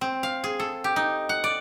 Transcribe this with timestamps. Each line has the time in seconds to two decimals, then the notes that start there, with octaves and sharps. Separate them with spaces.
0.01 C4
0.23 F5
0.44 G#4
0.60 A4
0.84 G4
0.96 D#4
1.29 F#5
1.44 D5